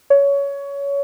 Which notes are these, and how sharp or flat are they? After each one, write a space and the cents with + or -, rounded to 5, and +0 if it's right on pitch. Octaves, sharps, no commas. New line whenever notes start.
C#5 +20